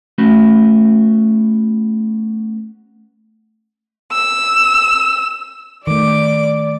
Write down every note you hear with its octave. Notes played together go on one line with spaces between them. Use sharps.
A3 B3 C#4 F#4 B4
E6
D#3 A3 D5 D6